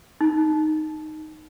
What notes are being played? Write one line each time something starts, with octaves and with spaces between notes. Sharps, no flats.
D#4